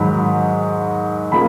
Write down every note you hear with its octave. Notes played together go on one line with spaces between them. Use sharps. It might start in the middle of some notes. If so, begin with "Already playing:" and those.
Already playing: G#2 D#3 F#3 B5
C#3 F3 A#3 B5